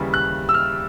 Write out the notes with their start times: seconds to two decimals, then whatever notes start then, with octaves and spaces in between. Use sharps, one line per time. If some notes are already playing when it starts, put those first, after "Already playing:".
Already playing: D#2 C#3 E3 G3
0.14 F#6
0.49 E6
0.54 F6